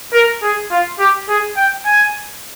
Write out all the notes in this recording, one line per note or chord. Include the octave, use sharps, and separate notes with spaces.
A#4
G#4
F4
G4
G#4
G5
G#5